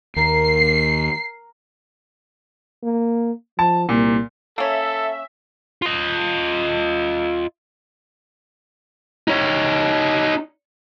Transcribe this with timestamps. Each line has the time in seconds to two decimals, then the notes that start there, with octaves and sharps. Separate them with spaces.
0.16 D#2 A#4 C7
2.83 A#3
3.59 F3 A5
3.89 C2 A#2
4.58 A#3 C#4 A4 E5
5.82 F4 D#5
9.28 D#4 C#5